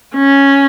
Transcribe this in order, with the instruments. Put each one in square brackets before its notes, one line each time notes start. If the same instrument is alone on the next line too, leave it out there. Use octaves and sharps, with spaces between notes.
[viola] C#4